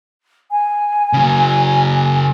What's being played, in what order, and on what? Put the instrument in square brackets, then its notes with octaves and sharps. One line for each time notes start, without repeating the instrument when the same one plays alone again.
[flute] G#5
[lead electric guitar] C#3 F#3